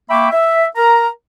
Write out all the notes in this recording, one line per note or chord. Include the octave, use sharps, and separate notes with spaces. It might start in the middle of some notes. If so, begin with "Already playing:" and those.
A#3 E5 G5 B5 C#6 D6
E5
A#4 A#5